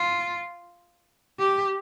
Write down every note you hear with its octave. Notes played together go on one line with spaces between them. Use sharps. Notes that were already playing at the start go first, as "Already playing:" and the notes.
Already playing: F4
G4